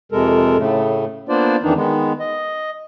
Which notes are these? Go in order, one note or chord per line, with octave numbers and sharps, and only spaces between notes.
F2 C3 G#3 A4 A#4
A2 C#3 A3
A#3 B3 D4 F4 C5 D5
F2 D#3 E3 D4 D#4
D#3 G#3 B3
D#5